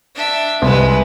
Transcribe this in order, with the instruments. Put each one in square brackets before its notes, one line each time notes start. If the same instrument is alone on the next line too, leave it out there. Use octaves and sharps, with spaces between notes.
[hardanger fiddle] D4 E5
[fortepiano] C2 [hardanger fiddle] G#3 B4